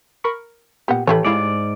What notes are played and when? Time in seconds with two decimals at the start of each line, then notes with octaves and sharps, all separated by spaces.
0.24 A#4 B5 C#6
0.88 A#2 B3 G4 F#5
1.07 A2 E3 A3 G4 C#5 B5
1.25 G#2 C3 G#3 E4 D5 F5